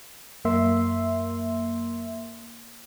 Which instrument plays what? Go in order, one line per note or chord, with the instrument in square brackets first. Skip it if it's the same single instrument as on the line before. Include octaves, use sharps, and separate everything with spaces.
[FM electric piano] F#2 A#3 E5 C6